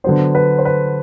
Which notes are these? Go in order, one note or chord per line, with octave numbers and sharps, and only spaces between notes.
D3 F#3 B3 C5
B4
C5
B4